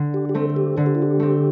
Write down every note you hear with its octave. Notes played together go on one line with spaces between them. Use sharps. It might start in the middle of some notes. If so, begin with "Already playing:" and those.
Already playing: D3
G4
G4
A3 C4 A4
A4
G4
D3 A4
G4
F4
G4
A3 C4